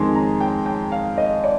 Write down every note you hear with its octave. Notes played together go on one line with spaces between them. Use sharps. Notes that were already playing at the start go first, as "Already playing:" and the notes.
Already playing: F2 D#3 G#3 C6
A#5
G5
G5
F5
D#5
D5